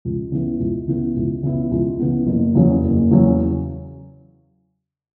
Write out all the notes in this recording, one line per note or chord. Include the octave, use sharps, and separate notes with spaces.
C#2
C#3 E3 B3 E4
C#2
C#3 E3 B3 E4
C#2
C#3 E3 B3 E4
C#2
C#3 E3 B3 E4
F#1
E2 C#3 F#3 C#4
F#1
E2 C#3 F#3 C#4